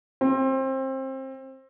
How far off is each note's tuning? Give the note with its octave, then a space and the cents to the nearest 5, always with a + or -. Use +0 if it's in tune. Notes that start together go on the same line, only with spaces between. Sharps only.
C4 +25